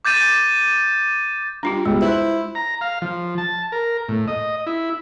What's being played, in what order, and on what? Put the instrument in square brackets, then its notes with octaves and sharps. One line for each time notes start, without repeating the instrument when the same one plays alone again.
[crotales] D6 G6 A6 D#7
[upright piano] G3 [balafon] D4 F4 F#4
[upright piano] C#2 B2 G3 [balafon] G#3
[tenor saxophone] E4 [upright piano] C5 F#6
[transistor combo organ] A#5
F5
F3
A5
A#4
A2
D#5
E4